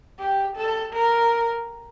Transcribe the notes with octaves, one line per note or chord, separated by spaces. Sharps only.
G4
A4
A#4